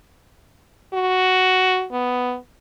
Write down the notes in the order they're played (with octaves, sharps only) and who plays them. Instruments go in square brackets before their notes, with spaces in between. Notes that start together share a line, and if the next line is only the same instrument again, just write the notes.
[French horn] F#4
B3